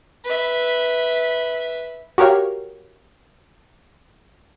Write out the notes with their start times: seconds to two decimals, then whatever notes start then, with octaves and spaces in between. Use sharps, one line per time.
0.25 B4 E5
2.18 F#4 G4 A#4 C#5 F5